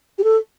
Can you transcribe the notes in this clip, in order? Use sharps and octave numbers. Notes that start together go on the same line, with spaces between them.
G4
A4